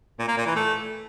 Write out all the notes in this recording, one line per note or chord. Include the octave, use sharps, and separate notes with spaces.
A#2
A#3
A#2
E3
A3